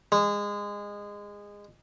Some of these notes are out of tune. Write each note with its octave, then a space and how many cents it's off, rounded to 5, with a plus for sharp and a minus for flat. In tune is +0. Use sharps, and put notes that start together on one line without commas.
G#3 -20